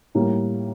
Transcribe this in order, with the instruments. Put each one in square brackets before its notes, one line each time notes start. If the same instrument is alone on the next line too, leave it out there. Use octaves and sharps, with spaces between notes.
[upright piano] A2 G3 A#3